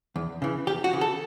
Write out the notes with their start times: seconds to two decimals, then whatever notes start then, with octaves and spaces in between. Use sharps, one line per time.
0.16 E2
0.42 C#3 E3
0.67 E2 G4
0.84 F#4
0.93 C#3 E3
1.01 A4